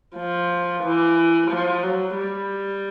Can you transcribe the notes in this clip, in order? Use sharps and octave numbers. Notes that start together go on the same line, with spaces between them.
F3
E3
F3
F#3
G3